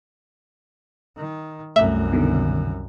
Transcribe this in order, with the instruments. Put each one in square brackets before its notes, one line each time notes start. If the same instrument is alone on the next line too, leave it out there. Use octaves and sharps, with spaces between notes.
[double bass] D#3
[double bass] C2 F#2 [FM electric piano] A3 [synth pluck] E5
[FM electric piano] B2 D3 D#3